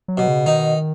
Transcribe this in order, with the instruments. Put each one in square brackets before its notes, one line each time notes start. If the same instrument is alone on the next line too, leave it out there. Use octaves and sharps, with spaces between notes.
[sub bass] F#3
[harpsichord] B2
[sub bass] C#3
[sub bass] D#3 [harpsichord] D#4